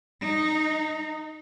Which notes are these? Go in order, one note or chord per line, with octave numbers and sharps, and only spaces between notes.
D#4